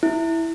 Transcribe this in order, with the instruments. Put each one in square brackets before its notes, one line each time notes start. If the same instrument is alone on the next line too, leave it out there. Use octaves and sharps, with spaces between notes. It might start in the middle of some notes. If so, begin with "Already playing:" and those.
[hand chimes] E4